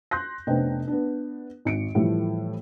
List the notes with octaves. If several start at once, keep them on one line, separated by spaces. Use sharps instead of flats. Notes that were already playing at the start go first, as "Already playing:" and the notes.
C6 F#6 G6 A#6
F1 B3 D4 C5 D#5 G5
B3 D4
G#1 C#7 D7
A2 E3 F3 G3 A3